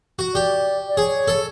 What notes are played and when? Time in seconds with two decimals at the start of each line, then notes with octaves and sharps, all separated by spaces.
0.19 F#4
0.34 G4 D5
0.88 D5
0.97 G#4 C#5
1.28 A4